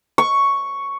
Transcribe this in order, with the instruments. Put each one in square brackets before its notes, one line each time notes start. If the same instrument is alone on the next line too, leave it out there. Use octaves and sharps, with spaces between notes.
[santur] C#6